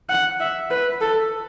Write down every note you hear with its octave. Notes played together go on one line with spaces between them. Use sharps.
F#5
E5
B4
A4